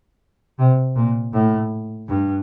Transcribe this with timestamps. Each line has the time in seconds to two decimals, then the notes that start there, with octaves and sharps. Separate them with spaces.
0.59 C3
0.96 A#2
1.33 A2
2.08 G2